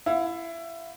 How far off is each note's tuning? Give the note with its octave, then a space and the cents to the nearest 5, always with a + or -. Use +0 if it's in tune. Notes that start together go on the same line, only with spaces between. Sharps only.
E4 +20 F5 +45